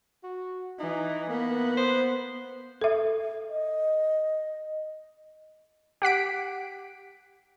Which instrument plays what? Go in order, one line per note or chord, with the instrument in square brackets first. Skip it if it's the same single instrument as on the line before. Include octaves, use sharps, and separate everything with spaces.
[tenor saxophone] F#4
[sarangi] E3 [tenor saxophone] D#4
[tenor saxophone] A#3 [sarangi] B3
[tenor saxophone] C5
[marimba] A4 E5
[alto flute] D#5
[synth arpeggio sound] G4 F#5 B6 D7